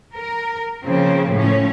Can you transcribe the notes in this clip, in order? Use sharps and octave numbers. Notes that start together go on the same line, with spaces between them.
A#4
C#3 F3 A#3 C4
A2 F3 C#4